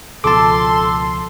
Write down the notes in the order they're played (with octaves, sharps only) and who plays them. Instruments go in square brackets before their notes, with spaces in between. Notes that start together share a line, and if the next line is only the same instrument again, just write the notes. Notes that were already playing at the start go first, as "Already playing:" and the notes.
[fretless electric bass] C#2 B2 F3 [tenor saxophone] A4 [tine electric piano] A5 D6 [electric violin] C6